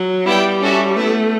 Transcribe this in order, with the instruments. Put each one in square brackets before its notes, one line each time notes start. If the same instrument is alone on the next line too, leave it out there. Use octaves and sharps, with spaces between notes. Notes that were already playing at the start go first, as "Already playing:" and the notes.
Already playing: [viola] F#3
[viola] G3 [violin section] B3 E4 B4 D5 G5
[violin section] C#4 F#4 A4 E5
[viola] A3 [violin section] B3 E4 B4